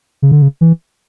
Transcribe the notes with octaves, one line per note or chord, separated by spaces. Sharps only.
C#3
D3
C#3
E3